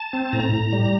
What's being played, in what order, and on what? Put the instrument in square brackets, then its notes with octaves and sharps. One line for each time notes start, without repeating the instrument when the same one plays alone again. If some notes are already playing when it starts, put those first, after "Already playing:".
Already playing: [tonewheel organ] A5
C4
A2 A#5
A2
G3